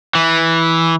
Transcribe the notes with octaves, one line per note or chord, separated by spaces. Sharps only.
E3